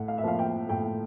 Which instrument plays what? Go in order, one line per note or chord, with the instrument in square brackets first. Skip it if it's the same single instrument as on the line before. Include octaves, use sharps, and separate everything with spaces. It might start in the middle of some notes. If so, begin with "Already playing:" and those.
Already playing: [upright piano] A2 F#5
F5
E5
F3 A#3 F5
G5
A2 G5